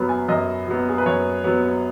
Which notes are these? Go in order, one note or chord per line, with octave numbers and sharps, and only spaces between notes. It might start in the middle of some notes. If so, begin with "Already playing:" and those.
Already playing: F#2 F#3 B3 B5
G#5
F#2 D#5
F#3 B3
G#4
B4
F#2 C#5
F#3 B3